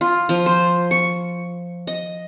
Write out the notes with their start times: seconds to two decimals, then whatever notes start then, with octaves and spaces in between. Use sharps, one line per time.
0.01 F4
0.29 F3
0.46 C5
0.91 C#6
1.87 D#5